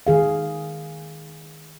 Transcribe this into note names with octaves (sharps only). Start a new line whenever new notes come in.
D#3 G#4 F5